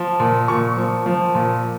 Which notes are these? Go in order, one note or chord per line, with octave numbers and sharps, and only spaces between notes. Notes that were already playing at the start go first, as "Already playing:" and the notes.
Already playing: F3
A#2
A#2 C#6
F3
F3
A#2